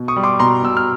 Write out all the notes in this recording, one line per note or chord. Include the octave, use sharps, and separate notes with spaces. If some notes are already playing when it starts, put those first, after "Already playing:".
Already playing: B2
C#6 D#6
G3
C6 D6
B2 A#5 C6
B2 E6
F6